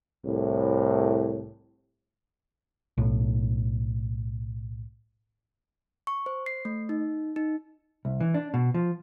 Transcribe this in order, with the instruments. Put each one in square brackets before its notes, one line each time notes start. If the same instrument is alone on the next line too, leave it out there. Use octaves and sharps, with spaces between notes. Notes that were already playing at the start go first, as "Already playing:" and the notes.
[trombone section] C2 A2
[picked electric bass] B1 A2
[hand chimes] C#6
C5
C7
A3
D#4
D#4
[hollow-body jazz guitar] C2
E3
D4
B2
F3